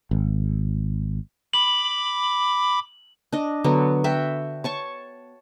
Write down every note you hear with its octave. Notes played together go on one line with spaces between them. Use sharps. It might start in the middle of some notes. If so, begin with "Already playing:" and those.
G#1
B5 D6 F#7
D4 D#5
D3 F#3 B3
F#4 E5 G5
C#5 A5 C#6